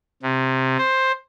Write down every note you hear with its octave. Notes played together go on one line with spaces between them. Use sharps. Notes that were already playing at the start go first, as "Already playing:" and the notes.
C3
C5